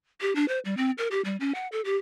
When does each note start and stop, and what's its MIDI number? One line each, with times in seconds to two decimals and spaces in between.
0.21 0.33 67
0.36 0.47 62
0.48 0.59 72
0.65 0.75 55
0.77 0.91 60
0.98 1.08 70
1.11 1.21 67
1.25 1.36 55
1.40 1.53 61
1.55 1.68 78
1.72 1.81 69
1.85 1.97 67